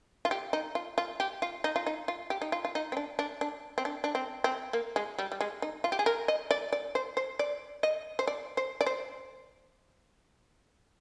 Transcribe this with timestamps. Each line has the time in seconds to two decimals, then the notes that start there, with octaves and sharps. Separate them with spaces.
0.25 F4
0.31 G4
0.53 D#4
0.75 F4
0.98 F4
1.20 G4
1.42 F4
1.64 D#4
1.76 F4
1.86 D#4
2.08 F4
2.30 G4
2.42 D#4
2.52 F4
2.65 F4
2.75 D#4
2.92 C4
2.97 D4
3.19 D4
3.41 D4
3.78 C4
3.85 D4
4.04 D4
4.15 C4
4.44 C4
4.73 A#3
4.96 G#3
5.18 G3
5.32 G3
5.41 G#3
5.62 D#4
5.84 F4
5.92 G4
5.99 G#4
6.06 A#4
6.28 D#5
6.51 D5
6.72 D5
6.95 C5
7.17 C5
7.39 D5
7.83 D#5
8.19 C5
8.27 D5
8.57 C5
8.81 D5
8.86 C5